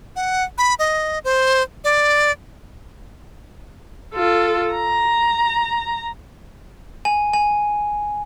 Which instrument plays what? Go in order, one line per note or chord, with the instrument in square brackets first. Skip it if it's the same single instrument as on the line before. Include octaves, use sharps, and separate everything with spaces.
[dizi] F#5
B5
D#5
C5
D5
[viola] F4 A4
A#5
[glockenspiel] G#5
G#5